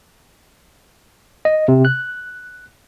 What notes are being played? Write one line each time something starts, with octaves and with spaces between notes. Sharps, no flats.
D#5
C3
F#6